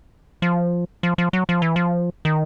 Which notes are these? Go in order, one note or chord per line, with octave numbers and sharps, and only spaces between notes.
F3
F3
F3
F#3
F3
E3
F3
D#3